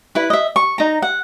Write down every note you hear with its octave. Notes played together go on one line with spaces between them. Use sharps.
E4 B4
D#5 E5
C#6
D#4 A#5
F#5